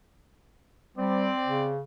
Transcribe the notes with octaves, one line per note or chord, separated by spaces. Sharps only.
G3 C4 D5
C#3